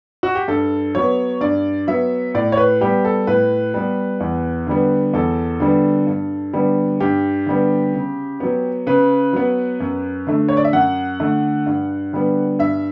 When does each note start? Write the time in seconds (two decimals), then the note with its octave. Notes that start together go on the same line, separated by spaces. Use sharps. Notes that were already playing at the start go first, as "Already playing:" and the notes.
0.23 F#4
0.35 G4
0.48 G2 A4
0.95 F#3 B3 C#5
1.41 G2 D5
1.87 F#3 B3 E5
2.34 A2 D5
2.52 C#5
2.57 B4
2.81 G3 B3 G4
3.05 A4
3.27 A2 B4
3.74 G3 B3
4.20 E2
4.67 D3 G3 B3
5.13 E2 A4
5.60 D3 G3 B3
6.07 G2
6.53 D3 G3 B3
7.00 G2 G4
7.46 D3 G3 B3
7.94 C#3
8.40 F#3 B3
8.87 C#3 B4
9.33 F#3 B3
9.80 F#2
10.27 D3 A3
10.49 C#5
10.57 D5
10.64 E5
10.73 F#2 F#5
11.20 D3 A3
11.66 G2
12.13 D3 G3 B3
12.59 G2 E5